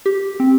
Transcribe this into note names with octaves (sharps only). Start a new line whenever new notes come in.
G4
C4